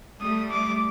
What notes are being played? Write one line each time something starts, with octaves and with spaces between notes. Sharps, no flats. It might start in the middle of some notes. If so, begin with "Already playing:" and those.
G3 A3 D#6
D6